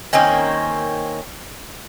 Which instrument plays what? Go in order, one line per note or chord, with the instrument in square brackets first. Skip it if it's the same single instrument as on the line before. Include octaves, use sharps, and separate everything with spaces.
[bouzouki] D#3 A#3 C4 C#4